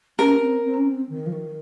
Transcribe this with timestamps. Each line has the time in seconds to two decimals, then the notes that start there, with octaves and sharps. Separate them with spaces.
0.19 C#4 A#4
0.42 C4
0.64 C4
0.77 C#4
0.90 C4
1.09 D#3
1.26 F3
1.32 D#3